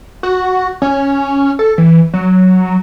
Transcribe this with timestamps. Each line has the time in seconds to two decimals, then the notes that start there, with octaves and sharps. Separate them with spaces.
0.23 F#4
0.82 C#4
1.59 A4
1.78 E3
2.14 F#3